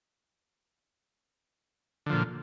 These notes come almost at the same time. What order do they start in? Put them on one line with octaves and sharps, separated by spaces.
D3 F3 A#2